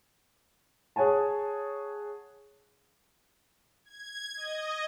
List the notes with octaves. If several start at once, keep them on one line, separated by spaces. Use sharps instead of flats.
G#4 C#5 F#5 G#5 A5
G#6
D#5